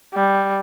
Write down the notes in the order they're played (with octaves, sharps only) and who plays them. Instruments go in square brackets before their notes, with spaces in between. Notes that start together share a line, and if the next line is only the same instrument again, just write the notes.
[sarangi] G3